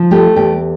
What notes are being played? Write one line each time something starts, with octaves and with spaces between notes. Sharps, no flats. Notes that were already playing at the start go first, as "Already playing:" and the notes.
Already playing: F3
A3 G4
E2 G4